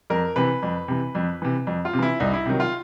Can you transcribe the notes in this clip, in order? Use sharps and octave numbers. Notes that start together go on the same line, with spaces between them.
F2 A#4
C3 E3 B4
F2
C3 E3
F2
C3 E3
F2
F4
C3
E3 E4
C2 D#4
E4
C3 D#3 F#3
F4